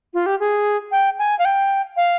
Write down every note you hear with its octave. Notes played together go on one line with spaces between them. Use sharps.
F4
G4
G#4
G5
G#5
F5
G5
F5